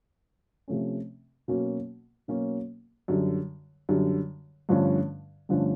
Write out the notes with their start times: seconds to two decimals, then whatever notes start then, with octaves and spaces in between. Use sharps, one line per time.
0.68 C3 F3 A3 C#4
1.48 B2 F#3 A#3 C#4
2.28 B2 F#3 A#3 C#4
3.08 F#2 D3 G3
3.89 F#2 D3 G3
4.69 G2 D3 F3 A3 C#4
5.49 G2 D3 F3 A3 C#4